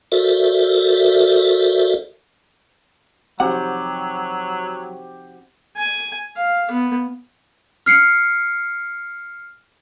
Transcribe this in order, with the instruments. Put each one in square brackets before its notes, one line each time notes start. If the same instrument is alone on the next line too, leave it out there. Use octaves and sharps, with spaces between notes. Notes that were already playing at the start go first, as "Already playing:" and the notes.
[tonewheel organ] F#4 A4 A#4 C5 D5 E5
[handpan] F3 C4 D#4 [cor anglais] F#3 [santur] F#4 G4 C5 [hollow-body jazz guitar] F#5
[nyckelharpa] G#5
F5
B3
[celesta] F6 C7 C#7